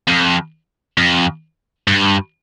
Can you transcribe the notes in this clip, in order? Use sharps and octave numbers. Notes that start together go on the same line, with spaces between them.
F2
F2
G2